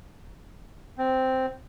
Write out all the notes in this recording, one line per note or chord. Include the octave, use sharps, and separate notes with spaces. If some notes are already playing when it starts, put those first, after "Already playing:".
C4